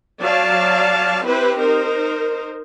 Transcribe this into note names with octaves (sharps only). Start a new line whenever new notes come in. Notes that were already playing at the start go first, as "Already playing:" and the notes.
F#3 D5 F5 A5
C4 E4 G4 B4 C5
D#4 A#4 C5